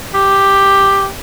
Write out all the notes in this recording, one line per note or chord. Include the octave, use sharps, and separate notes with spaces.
G4